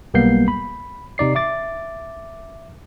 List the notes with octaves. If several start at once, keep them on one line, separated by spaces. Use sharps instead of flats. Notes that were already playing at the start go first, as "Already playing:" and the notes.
B1 G3 A#3 B3 G6 C7
B5
C3 D#4 D5 C7
E5 D6 A6